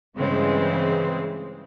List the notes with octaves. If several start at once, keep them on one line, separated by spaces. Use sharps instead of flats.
G2 C#3 E3 G#3 C4